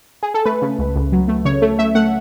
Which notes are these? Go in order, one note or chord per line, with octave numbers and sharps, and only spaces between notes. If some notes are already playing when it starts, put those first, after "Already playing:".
G#4
A4
A3 B4
C#3
C#2
C#2
F#3
A3
C#3 C#5
A3
A3 E5
A3 F#5